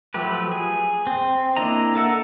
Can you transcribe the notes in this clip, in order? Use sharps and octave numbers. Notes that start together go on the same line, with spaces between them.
F3 F#3 A3 G4 B4
G#4
C4
A#3 D4 E4 D#5 A#5
A4 A#4 E5 F#5